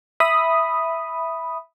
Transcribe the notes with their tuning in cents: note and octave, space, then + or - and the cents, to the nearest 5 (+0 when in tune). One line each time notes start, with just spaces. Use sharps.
E5 +0 B5 +0 D#6 +0